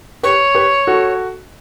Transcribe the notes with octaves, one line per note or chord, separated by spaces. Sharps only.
G4 B4 C#5
G4 B4
F#4 A4